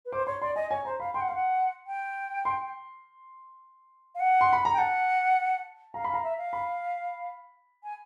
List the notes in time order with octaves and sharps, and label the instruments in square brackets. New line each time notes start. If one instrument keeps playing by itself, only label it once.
[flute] B4
[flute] C5 [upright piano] D6
[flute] C#5 [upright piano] C6
[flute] D5 [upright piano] C6
[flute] D#5 [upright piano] G#5
[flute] C#5 [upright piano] G#5
[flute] C5 [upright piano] A#5
[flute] F5 [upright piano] B5
[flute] G5 [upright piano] C6
[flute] F#5
[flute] F5 [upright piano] C6
[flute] F#5
G5
[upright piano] C6
[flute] F5
F#5
[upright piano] C6
B5
A#5
[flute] G5
[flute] F#5 [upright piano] A5
[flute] F5 [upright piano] A#5
[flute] F5 [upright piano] B5
[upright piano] A#5
[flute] E5
F5
[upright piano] B5
[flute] G#5